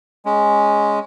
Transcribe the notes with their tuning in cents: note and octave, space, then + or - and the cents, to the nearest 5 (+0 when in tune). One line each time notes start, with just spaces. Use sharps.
G#3 +0 C#4 +0